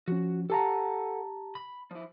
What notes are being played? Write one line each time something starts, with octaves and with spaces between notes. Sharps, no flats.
F3 C#4 F#4
G4 A4 F5 F#5 A5 A#5
B5
F3 E4